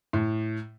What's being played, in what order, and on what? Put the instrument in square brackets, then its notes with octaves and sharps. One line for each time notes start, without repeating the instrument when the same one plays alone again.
[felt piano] A2